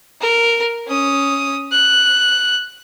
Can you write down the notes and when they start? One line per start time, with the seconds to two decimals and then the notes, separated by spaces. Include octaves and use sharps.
0.20 A#4
0.87 C#4 D#6
1.72 F#6